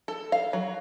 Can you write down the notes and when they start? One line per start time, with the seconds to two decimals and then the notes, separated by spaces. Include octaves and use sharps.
0.08 A4
0.32 F5
0.53 F#3